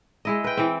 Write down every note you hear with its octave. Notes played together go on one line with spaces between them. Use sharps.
G#3 E4 D#5
B4 G5
E3 C4